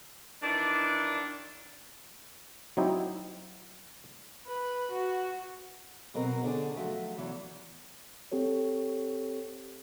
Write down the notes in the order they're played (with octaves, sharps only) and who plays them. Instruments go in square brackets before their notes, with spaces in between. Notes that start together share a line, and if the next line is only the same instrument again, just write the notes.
[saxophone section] D#3 E3 D4
[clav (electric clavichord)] F#3 C4 D#4 E4 G4
[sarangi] B4
F#4
[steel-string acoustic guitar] B2 F#3 C4 A#4
D3 C#4 D4 G#4
F3 F#3 A3 E5
E2 E3 F#3
[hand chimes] C4 G4 A4 C#5